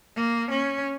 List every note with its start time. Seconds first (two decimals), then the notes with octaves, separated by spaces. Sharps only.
0.16 A#3
0.51 C#4